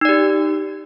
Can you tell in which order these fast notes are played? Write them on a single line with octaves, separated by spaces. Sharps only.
D#4 D5 G4